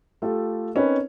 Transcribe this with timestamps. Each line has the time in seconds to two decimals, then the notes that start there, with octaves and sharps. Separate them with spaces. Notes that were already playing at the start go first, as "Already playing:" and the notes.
0.22 A3 F4 G4 A4
0.75 C4 C#4 D#4 A#4 B4